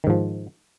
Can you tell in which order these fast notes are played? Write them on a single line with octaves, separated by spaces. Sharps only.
D#3 G#2 F3